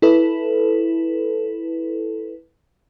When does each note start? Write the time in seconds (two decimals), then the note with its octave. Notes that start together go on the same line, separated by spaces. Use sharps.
0.02 E4 A4 B4